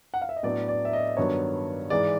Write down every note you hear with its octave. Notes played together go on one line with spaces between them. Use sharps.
F#5
F5
E5
D#5
A2 F#3 B3 D4 D5
D5
E5
D#5
G2 D#3 F#3 B3 D4 C#5
G#2 E3 G#3 D5